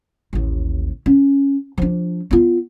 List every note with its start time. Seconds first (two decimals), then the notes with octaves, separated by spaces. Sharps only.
0.33 A1 D#2
1.06 C#4
1.78 F3 D4
2.31 B3 F4